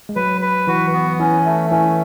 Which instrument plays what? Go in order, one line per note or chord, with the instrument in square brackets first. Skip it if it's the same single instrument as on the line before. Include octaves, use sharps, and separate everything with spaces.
[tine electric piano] G#3
[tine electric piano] F#3 [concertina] B4
[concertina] B4
[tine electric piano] E3 [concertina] F#4
[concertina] B3
[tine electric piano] E3 [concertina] C#4
[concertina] A3
[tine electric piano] E3 [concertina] C#4